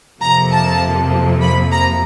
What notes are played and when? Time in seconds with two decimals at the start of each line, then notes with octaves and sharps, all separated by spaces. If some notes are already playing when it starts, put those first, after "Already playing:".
0.21 F2 C3 F3 A#3 A#5
0.52 A5
1.42 B5
1.72 A#5